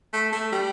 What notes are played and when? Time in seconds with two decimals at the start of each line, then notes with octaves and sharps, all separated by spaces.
0.13 A3
0.33 A3
0.52 G3